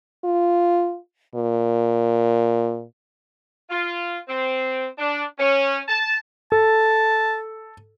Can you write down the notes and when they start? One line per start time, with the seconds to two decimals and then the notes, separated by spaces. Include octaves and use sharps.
0.24 F4
1.35 A#2
3.70 F4
4.28 C4
4.98 D4
5.39 C#4
5.88 A5
6.52 A4 A5